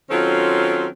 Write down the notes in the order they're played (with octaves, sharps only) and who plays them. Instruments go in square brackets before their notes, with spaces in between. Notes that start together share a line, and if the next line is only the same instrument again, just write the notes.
[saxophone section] D#3 F#3 C4 C#4 F4 A4